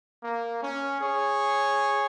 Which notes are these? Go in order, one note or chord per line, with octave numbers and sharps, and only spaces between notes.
A#3
C#4
G#4 C#5